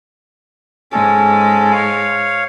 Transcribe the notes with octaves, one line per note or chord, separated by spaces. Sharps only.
G#2 G#3 C#4 A4
C#5 F5